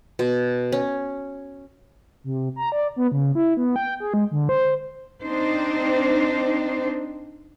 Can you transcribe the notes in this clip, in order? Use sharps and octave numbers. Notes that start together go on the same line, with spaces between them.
B2
C#4
C3
A#5
D5
B3
C#3
E4
B3
G5
G#4
G#3
D3
C5
C4 D4 D#4 C5